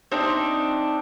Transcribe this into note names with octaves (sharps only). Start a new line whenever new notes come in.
C4 D4 D#4 E5